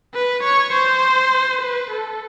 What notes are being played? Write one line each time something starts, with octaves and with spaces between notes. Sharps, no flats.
B4
C#5
C5
B4
A4